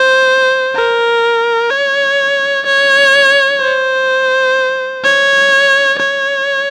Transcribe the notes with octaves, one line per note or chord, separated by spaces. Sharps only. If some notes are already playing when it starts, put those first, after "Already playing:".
Already playing: C5
A#4
C#5
C#5
C5
C#5
C#5